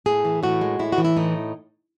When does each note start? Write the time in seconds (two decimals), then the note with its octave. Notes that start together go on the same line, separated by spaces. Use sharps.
0.06 A2 G#4
0.25 E3
0.43 A2 F#4
0.61 G#3
0.79 A2 E4
0.92 F#4
0.98 E3
1.05 E4
1.17 A2 D#4